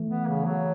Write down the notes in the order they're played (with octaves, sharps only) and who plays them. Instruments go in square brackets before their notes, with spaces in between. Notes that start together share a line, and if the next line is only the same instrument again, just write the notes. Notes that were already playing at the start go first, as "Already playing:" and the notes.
Already playing: [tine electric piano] E3 A3
[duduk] B3
C#3
F#3